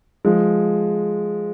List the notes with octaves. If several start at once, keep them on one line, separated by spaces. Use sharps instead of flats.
F3 G#3